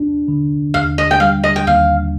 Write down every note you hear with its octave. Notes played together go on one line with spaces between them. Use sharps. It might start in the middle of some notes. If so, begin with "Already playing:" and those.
Already playing: D4
D3
D#2 F5
D#5
G5
G3 F5
D#5
G5
D#2 F5